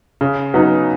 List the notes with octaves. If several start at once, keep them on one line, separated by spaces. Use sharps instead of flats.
C#3
F#3 B3 D#4